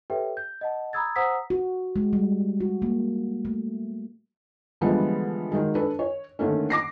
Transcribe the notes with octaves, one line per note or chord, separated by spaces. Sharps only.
G4 A4 B4 C#5 E5 G5
G6
D#5 F#5 A5
A#5 B5 D#6 E6 G#6 A6
C5 F#5 A#5 D#6 E6 B6
F#4
G#3
G3
F#4
A#3
A3
D3 E3 F3 G3 G#3 B3
D#3 F#3 G#3
D4 A4 B4
C#5
D3 D#3 A3 A#3 C#4
D6 A#6 C7